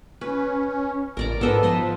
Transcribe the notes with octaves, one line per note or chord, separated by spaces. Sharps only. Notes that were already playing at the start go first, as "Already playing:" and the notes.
C#4 B4
A1 A#4 D5 A#5
G#2 B3 A4 D#5
F3 B4 D#5 C6